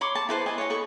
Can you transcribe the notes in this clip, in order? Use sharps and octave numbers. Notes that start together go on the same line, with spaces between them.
C#5 B5 C6 D6
A5
E4 B4 C5
B4 D#5 G#5
C#5 D#5
A4 B5 C#6